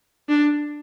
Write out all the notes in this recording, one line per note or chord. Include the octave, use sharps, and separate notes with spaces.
D4